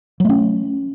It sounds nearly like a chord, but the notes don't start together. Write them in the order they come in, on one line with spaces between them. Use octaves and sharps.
F#3 A3 C#4